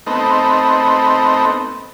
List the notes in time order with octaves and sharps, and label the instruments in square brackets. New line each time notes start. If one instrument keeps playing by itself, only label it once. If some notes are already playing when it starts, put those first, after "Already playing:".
[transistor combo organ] A3 B3 C4 D#4